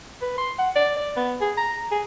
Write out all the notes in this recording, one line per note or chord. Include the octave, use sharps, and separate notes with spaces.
B4
C6
F#5
D5
D5
B3
G#4
A#5
G#4